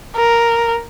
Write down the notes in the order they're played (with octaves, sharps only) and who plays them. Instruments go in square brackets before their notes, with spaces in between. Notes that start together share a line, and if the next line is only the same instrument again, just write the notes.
[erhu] A#4